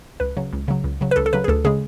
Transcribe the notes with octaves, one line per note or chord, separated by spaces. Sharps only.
C#2 B4
C#3 F#3
C#2
C#3 F#3
C#2
C#3 F#3
B4
C#2 A4
A4
C#3 F#3 B4
G#4
D2 A4
C#3 G#3 G#4